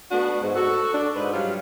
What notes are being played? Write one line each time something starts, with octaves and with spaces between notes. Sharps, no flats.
A3 B3 D4 F#4
G#2
F#4 A4
D4
G#2 B4
F#3 G3 F4